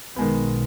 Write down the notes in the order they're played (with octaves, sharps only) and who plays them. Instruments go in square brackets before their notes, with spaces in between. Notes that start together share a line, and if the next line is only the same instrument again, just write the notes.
[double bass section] B1 B2 [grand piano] D#3 G#3 B3